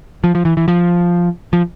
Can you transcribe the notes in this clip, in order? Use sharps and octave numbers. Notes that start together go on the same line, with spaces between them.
F3
F3
E3
E3
F3
F3